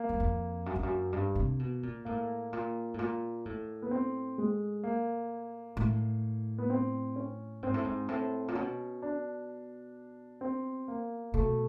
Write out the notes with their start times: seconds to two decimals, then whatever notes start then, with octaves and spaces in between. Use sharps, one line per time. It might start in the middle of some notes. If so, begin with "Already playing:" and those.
Already playing: A#3
0.09 F#2
0.20 F2
0.66 F#2
0.75 F2
0.83 F#2
1.13 G2
1.35 C3
1.59 B2
1.83 A#2
2.05 A2 A#3
2.53 A#2
2.94 A2
2.99 A#2
3.45 A2
3.82 B3
3.91 C4
4.38 G#3
4.84 A#3
5.77 A2
6.58 B3
6.70 C4
7.16 C#4
7.62 G#2 C4
7.74 A2
7.84 G#2
8.08 A2 C4
8.48 A#2
8.55 B2 C#4
9.02 D4
10.41 C4
10.88 A#3
11.34 B2 A3